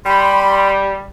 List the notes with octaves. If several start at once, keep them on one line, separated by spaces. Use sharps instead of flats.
G3 B5 C6